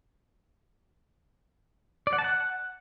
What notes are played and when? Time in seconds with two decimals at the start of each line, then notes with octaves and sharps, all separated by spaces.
2.07 D5
2.13 F#5
2.18 A5
2.24 F#5